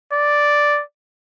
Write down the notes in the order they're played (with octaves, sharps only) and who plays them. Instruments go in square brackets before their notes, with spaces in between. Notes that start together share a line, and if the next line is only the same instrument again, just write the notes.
[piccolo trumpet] D5